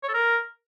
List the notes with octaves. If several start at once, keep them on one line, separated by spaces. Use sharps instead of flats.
C#5
A4
A#4